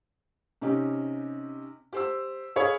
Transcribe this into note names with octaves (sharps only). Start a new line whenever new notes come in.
C3 C#4 D#4 G4
G4 C5 E6
G#4 C#5 F5 B5